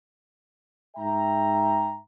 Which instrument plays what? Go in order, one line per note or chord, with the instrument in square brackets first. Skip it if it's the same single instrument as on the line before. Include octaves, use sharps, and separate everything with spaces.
[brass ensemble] G#2 E5 G5 A#5